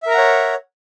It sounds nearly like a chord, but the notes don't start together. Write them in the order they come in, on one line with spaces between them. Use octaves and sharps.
E5 A#4 A#5 F#5 C#5